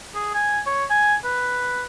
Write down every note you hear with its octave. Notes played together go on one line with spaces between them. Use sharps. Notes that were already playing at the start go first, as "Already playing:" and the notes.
G#4
G#5
C#5
G#5
B4